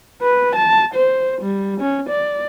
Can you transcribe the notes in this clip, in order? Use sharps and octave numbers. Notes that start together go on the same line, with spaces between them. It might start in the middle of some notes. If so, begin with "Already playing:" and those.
B4
A5
C5
G3
C#4
D5